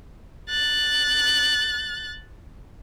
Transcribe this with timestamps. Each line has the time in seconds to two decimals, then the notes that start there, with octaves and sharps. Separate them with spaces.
0.50 F#6 A6